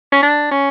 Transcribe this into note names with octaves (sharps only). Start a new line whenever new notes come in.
C#4
D4
C#4